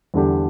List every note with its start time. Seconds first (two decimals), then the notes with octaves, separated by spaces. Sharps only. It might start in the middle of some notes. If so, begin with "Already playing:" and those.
0.14 E2 D3 G3 D4 G4